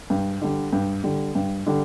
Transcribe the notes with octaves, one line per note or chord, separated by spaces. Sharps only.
G2
D3 G3
G2
D3 G3
G2
D3 G3